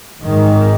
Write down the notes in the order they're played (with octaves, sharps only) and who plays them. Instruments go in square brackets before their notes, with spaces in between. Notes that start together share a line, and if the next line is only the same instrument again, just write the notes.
[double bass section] G#1 G#2 D#3